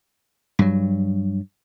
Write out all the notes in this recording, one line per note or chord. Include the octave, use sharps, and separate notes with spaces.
G2 F#3